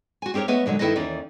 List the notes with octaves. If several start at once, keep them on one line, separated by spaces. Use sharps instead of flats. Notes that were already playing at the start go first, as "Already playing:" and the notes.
F#4 G#5
C4 G4 G#4 A#4 C#5
A3 B3 B4 C#5 D#5 E5
A#2 D3 F#3 G#3
G2 D#3 E4 A4 B4 D#5
D#2 E3 C#4 D5